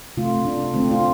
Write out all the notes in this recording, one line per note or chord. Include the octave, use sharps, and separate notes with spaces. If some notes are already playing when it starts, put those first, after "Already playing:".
C3 A3 F4
D4
D3 A3 C4
F4